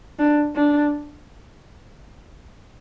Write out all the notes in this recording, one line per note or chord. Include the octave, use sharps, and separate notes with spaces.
D4
D4